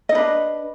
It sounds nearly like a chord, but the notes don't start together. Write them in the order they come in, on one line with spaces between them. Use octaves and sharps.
D#5 D#4 B4 D4